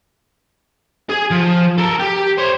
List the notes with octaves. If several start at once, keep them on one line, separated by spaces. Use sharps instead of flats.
G#4 G#5
F3
A4 A#4
G4
C5 C#5